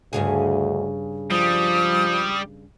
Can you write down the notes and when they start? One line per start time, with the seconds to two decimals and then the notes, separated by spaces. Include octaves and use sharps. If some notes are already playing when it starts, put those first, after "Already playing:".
0.13 D2 G2 C#3 G#4
1.31 F3 G3 D#6